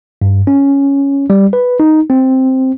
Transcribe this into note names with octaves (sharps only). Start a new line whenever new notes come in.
G2
C#4
G3
B4
D#4
C4